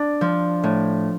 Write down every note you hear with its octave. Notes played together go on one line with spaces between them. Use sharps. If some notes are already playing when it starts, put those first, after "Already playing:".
Already playing: D4
F3
A2